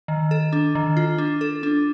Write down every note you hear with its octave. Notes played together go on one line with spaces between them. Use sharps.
D#3
A4
D4
D#3
F4
D4
A4
D4